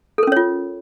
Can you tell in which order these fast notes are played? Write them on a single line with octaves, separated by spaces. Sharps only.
A4 A#4 C#4 C#5 F4